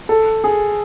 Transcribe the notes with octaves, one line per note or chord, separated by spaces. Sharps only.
A4
G#4